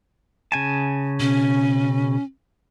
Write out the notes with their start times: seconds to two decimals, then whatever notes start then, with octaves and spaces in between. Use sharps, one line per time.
0.52 C#3 G#5 A5
1.20 B2 C#4